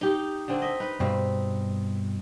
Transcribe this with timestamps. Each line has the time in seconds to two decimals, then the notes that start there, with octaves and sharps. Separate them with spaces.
0.01 D#4 G4
0.48 D3 C4 D4
0.62 D#5 E5
0.80 D#4 B4
1.00 G2 B2 C4 B4